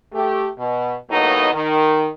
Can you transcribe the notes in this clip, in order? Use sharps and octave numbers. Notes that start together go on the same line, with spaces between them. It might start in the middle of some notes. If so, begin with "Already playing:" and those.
A3 G4
B2
A2 F#3 A#3 B3 D#4 D#5
D#3